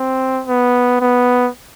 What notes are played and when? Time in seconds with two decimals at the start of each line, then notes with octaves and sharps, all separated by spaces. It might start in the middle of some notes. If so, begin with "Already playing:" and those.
Already playing: C4
0.47 B3
1.01 B3